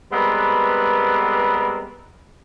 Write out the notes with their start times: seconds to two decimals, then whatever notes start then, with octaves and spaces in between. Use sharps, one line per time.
0.12 G3 G#3 B3 C4 A#4 B4